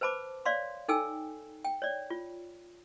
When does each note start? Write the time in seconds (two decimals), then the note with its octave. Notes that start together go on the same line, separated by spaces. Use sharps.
0.01 B4 C5 A5 B5 D6
0.46 C#5 D5 F5 C6
0.88 D#4 A4 G5 G#5 E6
1.65 G5
1.82 C#5 D5
2.10 F4